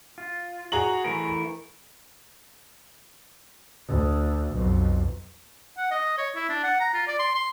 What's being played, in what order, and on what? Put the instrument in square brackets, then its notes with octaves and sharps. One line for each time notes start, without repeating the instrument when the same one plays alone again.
[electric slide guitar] F4
[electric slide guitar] F#4 [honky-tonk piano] G#4 A#5 F#7
[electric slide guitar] E3 A3 A#4
[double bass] D2
B1 F2
[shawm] F#5
D#5
C#5
E4
D4
F#5
A#5
F4
D5
C6
C6